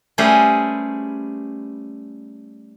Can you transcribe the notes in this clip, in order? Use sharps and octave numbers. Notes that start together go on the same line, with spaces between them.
G3 A3 C#4 G#4 B4 C5